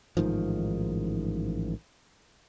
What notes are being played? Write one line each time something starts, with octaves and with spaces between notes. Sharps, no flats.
A1 G#2 D#3 F3